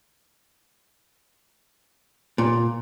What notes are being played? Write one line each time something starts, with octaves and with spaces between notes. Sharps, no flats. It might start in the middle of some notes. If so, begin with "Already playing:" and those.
A#2